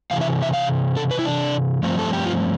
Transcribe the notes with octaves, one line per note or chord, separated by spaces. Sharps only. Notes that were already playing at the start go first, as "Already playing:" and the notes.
C3 E3 F5
E5
E5
F5
A4
B4
E4
D4
G2 F3 A3 C4
A4
G4
F4